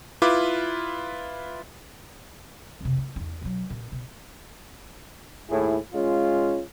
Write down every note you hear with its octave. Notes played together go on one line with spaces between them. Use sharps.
E4 F4 B4 D6
F2 C3
A3
E2 D#4
B2 F#3
A#2
B2
D#2 A2 E4 G#4
G#3 C#4 F4